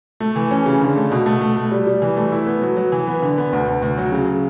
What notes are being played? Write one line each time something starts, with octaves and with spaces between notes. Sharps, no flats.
A3
E3
C#4
C#3
D3
A3
B2
A3
A3
A3
G3
G3
E3
A3
E4
B3
F#3
F#3
E3
B3
D3
B3
D2
D2
D2
F#3
C#3